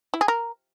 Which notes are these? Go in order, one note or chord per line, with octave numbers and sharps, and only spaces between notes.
E4
G#4
A#4